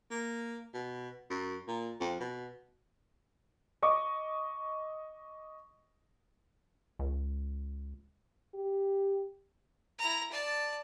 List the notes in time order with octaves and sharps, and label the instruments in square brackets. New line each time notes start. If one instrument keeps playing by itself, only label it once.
[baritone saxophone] A#3
B2
F#2
A#2
F2
B2
[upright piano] D#5 C#6 D6
[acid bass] C#2
[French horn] G4
[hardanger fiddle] E4 A#5
D5 A5